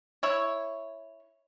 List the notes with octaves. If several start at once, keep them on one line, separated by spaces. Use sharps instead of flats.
E4 C#5